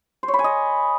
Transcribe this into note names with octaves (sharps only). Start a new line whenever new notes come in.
C5
C#5
B5
G#5
D#5